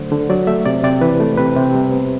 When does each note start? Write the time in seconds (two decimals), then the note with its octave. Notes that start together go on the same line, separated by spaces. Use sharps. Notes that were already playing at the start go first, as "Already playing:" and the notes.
Already playing: D3 F#3 A3 C5
0.11 D3
0.29 F#3 D5
0.47 A3 E5
0.65 C3 D5
0.83 C3 D5
1.01 E3 B4
1.20 A3
1.38 C3 B4
1.56 C3
1.74 G3
1.92 B3